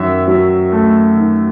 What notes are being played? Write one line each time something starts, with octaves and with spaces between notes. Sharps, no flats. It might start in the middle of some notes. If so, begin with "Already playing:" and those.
Already playing: F#2 D#3 E5
F#3
A3
D#3